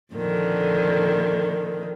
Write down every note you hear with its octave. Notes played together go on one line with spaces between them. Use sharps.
F2 A#2 D3 D#3